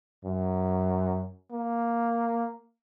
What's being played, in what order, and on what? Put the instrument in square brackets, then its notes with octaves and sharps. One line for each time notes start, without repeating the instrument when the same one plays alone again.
[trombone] F#2
A#3